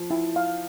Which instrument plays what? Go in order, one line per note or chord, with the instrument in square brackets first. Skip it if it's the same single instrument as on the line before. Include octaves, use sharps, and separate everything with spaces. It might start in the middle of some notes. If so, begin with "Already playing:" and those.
Already playing: [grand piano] F3
[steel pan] E4
F5